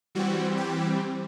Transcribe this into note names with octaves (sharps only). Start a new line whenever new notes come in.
E3 G3 C4 F#4
G4